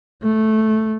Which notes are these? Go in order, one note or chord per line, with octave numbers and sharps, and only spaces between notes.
A3